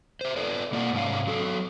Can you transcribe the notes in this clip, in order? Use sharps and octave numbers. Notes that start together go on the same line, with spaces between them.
C5 E5
A4 B4 D5
B2 A#3 F4 D5 F#5
G#2 C3 G#3 C#4 F5
F#3 A4